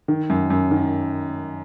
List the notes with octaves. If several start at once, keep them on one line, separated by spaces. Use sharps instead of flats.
D#3
F#2
F#2
D#3